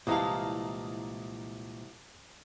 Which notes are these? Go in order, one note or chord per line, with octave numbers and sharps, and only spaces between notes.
C2 A#2 E3 G#3 F5 A5 A#5 D#6